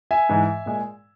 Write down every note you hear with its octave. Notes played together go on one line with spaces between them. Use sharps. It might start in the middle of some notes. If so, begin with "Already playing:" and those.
E5 G#5
G#2 E3 G#3
A#2 G#3